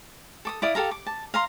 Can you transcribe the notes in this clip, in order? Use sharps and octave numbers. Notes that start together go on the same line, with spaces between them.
A4 D6 D#6
E4 D5 F5 D#6
G4 A4 F5 A#5
D6
A5
F5 A#5 C6